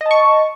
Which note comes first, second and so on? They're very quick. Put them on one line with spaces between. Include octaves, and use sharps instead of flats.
D#5 A5 C#6